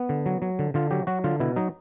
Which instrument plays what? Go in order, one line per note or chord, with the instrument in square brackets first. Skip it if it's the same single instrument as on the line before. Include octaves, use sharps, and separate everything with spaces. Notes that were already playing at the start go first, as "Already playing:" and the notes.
Already playing: [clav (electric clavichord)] B3
D3
F#3
F#3
D3
D3 F4
F#3 G4
F#3 F#4
D3 F4
B2 E4
F#3 D#4